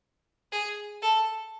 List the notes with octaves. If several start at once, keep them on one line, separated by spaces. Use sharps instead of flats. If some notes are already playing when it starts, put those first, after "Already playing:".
G#4
A4